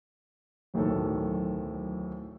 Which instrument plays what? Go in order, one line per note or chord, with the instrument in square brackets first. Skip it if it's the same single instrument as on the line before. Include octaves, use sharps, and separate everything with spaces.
[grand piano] D1 B1 A2 D#3 A4